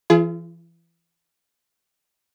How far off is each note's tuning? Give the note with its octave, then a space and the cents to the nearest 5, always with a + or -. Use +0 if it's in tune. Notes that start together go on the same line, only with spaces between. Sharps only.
E3 +30 F4 -35 G#4 +30